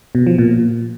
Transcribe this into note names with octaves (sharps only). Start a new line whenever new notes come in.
B2
F3
A#2